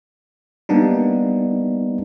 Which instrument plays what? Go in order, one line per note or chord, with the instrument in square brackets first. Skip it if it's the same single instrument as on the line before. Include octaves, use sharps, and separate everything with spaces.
[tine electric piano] G3 A#3 B3 D4 D#4